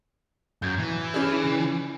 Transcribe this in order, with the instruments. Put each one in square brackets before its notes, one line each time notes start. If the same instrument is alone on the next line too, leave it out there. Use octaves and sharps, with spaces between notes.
[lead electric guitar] F#2 [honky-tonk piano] G6 G#6
[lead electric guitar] E3
[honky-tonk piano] C#4 D4 G#4
C#3